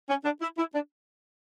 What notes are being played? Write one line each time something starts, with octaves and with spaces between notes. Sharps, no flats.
C#4
D4
E4
E4
D4